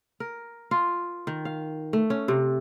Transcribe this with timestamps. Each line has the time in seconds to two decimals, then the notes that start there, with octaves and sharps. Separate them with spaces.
0.20 A#4
0.71 F4
1.27 D#3
1.45 F5
1.93 A3
2.10 C#4
2.28 C3